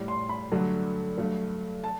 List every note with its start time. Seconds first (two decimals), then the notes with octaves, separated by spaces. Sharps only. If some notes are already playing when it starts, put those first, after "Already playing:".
Already playing: A2 G3
0.08 C6
0.29 B5
0.52 G2 D3 F#3 A3
1.18 G2 F#3 A3
1.84 A5